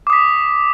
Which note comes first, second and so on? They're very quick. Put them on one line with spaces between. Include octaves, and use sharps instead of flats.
D6 D#6 B6